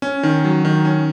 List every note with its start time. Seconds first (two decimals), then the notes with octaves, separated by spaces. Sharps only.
0.02 C#4
0.23 D#3
0.44 F#3
0.65 D#3
0.85 C#4